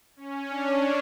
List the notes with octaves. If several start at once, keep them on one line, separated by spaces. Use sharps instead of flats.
C#4
D4